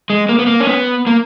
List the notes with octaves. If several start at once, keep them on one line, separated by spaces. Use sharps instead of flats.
G#3
A#3
B3
A#3
C#4
B3
A#3